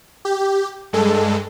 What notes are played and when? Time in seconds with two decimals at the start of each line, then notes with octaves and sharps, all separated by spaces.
0.25 G4
0.93 G2 G#3 A4